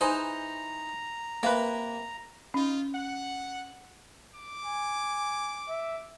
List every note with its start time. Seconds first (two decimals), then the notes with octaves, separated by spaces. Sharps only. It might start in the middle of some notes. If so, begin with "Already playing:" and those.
0.01 E3 D#4 G#4 C5 A#5
1.43 C3 A#3 B4
2.54 C#4 D#4 F4
2.94 F#5
4.35 D6
4.65 G#5
5.68 E5